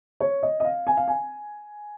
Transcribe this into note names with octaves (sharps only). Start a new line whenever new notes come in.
C#5
D#5
D#5
F5
G#5
F5
G#5